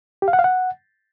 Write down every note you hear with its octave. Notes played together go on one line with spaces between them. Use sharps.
G4
F5
F#5
F5
F#5